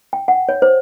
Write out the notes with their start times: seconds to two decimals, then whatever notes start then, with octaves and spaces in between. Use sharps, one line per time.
0.13 G5
0.28 F#5
0.49 C#5
0.62 C5